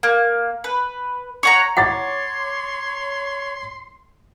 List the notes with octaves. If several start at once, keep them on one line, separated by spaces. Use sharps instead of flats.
A#3
B4
C#5 F#5 A#5
C#5 F#5 A#5 C6 D6 A6